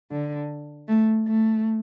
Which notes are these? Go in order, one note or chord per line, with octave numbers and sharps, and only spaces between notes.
D3
A3
A3